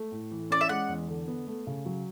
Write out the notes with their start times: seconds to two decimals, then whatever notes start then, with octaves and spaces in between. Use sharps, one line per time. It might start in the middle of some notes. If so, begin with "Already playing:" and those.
Already playing: A3
0.12 A2
0.31 E3
0.50 C#4 D5
0.61 E5
0.69 G#3 F#5
0.89 E2
1.09 D3
1.27 B3
1.47 A3
1.67 C#3
1.86 F#3